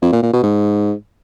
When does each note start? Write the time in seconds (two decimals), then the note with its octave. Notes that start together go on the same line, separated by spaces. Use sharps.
0.02 F2
0.12 A#2
0.23 A#2
0.33 B2
0.43 G#2